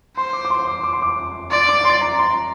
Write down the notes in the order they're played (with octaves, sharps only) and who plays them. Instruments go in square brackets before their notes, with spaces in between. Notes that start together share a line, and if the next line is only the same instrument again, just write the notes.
[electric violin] C5 [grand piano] C6
[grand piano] D6
D6
C6
D6
D6
C6
D6
[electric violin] D5 [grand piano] C6
[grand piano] D6
C6
A#5
C6